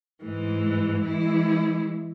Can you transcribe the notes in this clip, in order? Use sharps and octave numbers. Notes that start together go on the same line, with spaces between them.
G#2 E3 G#3
E3 G#3 E4